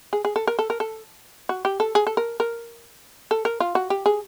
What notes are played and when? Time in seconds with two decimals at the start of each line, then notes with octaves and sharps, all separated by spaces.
0.13 G#4
0.25 G#4
0.36 A4
0.47 A#4
0.59 A4
0.70 A#4
0.80 A4
1.49 F#4
1.65 G4
1.80 A4
1.95 G#4
2.07 A4
2.17 A#4
2.40 A#4
3.31 A4
3.45 A#4
3.60 F4
3.75 F#4
3.90 G4
4.06 G#4